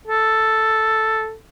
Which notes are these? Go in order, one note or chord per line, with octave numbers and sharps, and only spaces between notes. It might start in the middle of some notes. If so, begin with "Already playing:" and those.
A4